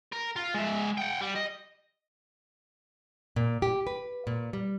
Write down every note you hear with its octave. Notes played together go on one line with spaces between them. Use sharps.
A#4
F4
G#3 E5
F#5 G5
G3
D#5
A#2
G4
B4
A#2
G3